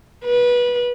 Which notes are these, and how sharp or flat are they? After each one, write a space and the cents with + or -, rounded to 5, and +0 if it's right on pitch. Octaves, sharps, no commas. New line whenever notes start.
B4 -20